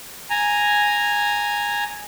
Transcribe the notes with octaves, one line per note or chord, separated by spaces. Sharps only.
G#5 A#5